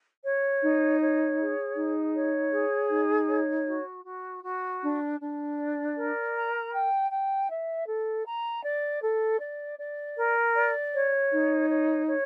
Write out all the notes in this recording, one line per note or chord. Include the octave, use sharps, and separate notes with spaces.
C#5
D#4
C#5
G#4
D#4
C#5
G#4
D#4
C#5
F#4
F#4
F#4
D4
D4
D5
A#4
A#5
G5
G5
E5
A4
A#5
D5
A4
D5
D5
A#4
D5
C#5
D#4
C#5
C#5